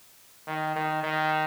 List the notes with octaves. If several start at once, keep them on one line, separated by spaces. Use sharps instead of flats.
D#3
D#3
D#3